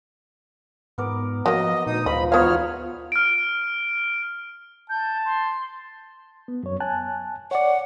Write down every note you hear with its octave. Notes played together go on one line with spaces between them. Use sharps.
G#2 B3 A#4 D5
F3 F#3 A#3 D#5
D2 A#2 D#4 D#6
D2 G#2 F3 D#5 B5
E2 B3 D#4 F4 F#4 C#5 F5 F6
F6 D7
A5 G6
C6
B3
F#2 C#5
G#5 A5 F#6
C#5 D5 F#5